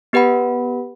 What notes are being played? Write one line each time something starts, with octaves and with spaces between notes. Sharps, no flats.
B3 G4 B4 F#5 B5